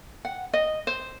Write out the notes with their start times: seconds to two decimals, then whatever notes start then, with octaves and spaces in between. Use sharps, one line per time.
0.25 F#5
0.53 D#5
0.87 C5